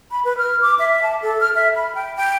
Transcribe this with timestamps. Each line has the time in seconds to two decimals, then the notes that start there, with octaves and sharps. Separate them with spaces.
0.11 B5
0.25 B4
0.38 F6
0.61 D6
0.79 E5
1.03 A5
1.22 A4
1.40 F6
1.55 E5
1.76 B5
1.95 G5
2.16 G5